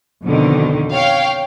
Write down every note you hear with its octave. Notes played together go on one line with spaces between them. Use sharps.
F2 B2 D3 D#3
C#5 F5 G5